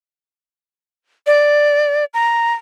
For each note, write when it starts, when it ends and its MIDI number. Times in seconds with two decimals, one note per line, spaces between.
1.27 2.05 74
2.14 2.53 82